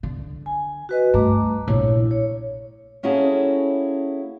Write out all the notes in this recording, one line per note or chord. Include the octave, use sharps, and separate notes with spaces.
D3
G#5
F#4 B4 D#5
G2 A3 A#5 D6
A#1 E4 C#5
C#5
A#3 C#4 E4 F#4 G#4 A4